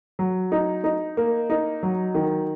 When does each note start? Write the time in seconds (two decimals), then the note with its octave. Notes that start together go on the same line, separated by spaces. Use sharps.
0.19 F#3
0.52 D#4
0.84 D#4
1.17 A#3
1.50 D#4
1.83 F#3
2.15 D#3